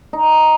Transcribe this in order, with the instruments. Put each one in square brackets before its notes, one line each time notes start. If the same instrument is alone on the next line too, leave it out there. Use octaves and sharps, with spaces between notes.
[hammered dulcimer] D#4